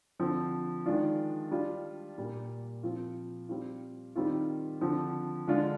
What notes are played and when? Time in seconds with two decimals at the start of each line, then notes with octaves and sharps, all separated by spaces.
0.19 D3 F3 C4
0.86 D#3 G#3 D4 F4
1.51 G3 D4 F4
2.18 A#2 G3 A#3
2.83 F3 C4 F4
3.49 G3 C4 F4
4.16 D#3 G3 C4 F4
4.81 D3 F3 C4
5.47 D3 G#3 D4 F4